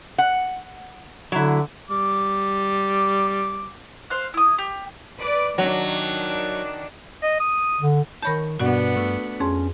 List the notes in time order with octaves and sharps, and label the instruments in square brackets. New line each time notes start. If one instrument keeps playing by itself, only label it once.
[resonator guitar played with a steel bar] F#5
[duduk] D3 [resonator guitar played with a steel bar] F#3 E4
[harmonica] G3 D6
[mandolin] C5 F5 F#6
E4 D#6
G4
[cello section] B4 D5
[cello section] D#3 D4 [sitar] F#3
[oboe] D#5
D#6
[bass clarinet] D3
[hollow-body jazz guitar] D#3 C#5 A5 [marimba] A#4 B5 G6
[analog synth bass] G2 [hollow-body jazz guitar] B2 [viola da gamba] B3 D4 [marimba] F#4 D5 F#5
[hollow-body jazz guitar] A3
[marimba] F2 G#4 C6 [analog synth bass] C#4